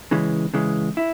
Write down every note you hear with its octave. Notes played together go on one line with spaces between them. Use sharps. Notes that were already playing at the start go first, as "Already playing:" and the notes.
C#3 E3 G#3
C#3 E3 G#3
E4